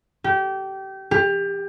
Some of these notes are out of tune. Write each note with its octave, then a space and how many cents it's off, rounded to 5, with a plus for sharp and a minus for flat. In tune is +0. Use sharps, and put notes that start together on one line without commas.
G4 -25
G4 +25